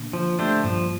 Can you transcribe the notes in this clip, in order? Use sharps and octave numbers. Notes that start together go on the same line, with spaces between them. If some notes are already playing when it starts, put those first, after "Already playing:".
Already playing: A#2 D3
F3
A3 D4 G4 C5
G2 A#2 F3